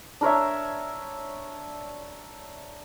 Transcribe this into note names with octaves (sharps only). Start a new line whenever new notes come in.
D4 A#4 C#5 E5